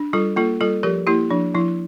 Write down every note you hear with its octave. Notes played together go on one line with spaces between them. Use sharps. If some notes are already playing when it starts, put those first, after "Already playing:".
Already playing: D4
G3 F4 A4
A#3 F4 A4
G3 F4 A4
F3 G4 A#4
A#3 E4 G4
F3 D4
F3 E4